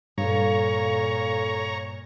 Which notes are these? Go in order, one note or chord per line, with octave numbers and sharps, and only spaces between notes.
G2 A#2 A4 C#5 F5 A#5